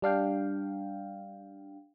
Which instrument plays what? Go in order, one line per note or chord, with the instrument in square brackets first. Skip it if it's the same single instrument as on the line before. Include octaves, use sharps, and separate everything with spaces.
[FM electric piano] G3 D4 F5 G5